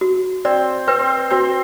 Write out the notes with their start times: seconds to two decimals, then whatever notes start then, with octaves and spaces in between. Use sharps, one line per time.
0.01 F#4
0.45 C4 C5 D5
0.87 C4 B4 C5
1.30 C4 F#4 C5